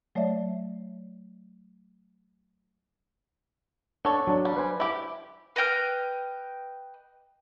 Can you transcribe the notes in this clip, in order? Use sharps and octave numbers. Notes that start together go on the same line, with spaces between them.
F#3 A3 C#5 D5 E5
D4 A4 C#5 A5
F#3 D4
G3
B4 C5 G#5
E4 G4
B4 D#5 G5 F6